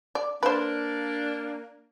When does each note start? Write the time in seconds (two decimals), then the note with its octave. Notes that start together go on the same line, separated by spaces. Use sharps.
0.15 D5
0.43 A#3 D4 B4 C5